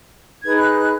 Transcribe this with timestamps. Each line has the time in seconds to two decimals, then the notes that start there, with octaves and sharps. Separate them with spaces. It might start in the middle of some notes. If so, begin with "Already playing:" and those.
0.42 D#4 G#4 B4 G#6
0.59 F#6
0.76 F#6